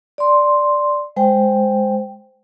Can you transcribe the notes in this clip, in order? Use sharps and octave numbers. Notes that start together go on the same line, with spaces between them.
D5 C6
G#3 C5 G5